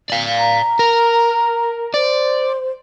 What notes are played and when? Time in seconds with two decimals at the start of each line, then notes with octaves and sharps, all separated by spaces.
0.10 D5 F5
0.38 A#5
0.79 A#4
1.94 C5 D5